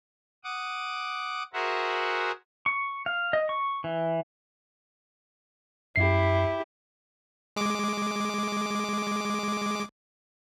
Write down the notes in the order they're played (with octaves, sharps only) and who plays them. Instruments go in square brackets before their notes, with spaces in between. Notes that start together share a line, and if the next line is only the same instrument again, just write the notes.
[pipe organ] F#5 D6 D#6
F#4 G#4 A#4 C5 E5 F#5
[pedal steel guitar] C#6
F5
D#5
C#6
E3
[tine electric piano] F#2 C7 [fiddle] E4 G4
[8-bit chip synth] G#3 D6